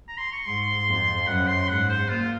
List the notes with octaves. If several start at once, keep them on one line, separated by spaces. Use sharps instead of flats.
A#5
C6
C#6
G#2 C6
F2
F#2 F#5
C6
G#2 F#5
C5
A#2 F4